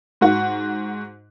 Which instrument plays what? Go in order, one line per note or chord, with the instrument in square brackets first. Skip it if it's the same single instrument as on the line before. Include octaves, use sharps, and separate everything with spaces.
[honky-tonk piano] G#2 F#4